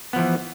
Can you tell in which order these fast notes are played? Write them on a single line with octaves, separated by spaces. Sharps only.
B3 F3 E3